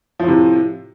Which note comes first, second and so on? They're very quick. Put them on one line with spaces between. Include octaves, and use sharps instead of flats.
F3 A2 C3